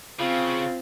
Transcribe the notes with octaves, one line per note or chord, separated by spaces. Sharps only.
C#3 C4 F4